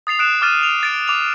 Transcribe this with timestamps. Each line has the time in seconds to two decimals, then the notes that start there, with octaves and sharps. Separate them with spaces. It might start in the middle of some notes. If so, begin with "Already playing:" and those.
0.07 D#6 A6 C7 F7
0.19 D#6 F#6 C7 D7 E7
0.42 D6 F6 A6 D#7
0.63 F7
0.83 A6 D7
1.08 D6 F7